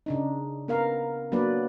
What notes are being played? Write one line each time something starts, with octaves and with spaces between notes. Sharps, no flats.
C#3 D4 D#4
B3 A#4 F5
F#3 A#3 B3 D4 B4 D5